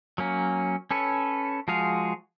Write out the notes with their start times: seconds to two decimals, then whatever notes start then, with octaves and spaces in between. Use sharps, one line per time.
0.18 F#3 A#3 C#4
0.91 C#4 A4 B4 C#5
1.68 F3 G#3 F#4 G#4 F5